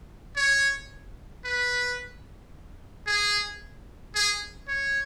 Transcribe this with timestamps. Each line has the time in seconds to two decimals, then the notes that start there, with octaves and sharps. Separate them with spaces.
0.36 C#5
1.45 B4
3.07 G#4
4.15 G#4
4.68 C#5